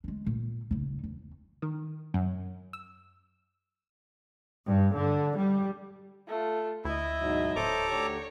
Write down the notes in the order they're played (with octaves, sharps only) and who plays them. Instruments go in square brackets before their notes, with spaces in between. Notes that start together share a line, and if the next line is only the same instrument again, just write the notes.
[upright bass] G#3 D4
A#2
F#1 D#4
E2
[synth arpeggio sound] D#3
F#2
E6
[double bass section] G2
D3
G3
[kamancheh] A3 F4
[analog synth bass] D2 [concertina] E4 [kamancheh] D#5 E5
[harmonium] G#2 B2 F#3
[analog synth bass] D1 [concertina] A4 A#5 D6 [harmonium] C5 C#5
[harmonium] D2 D3 G4 [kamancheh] C#5